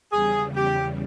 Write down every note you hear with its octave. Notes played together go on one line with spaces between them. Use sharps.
E2 C#3 G3 G#4
G4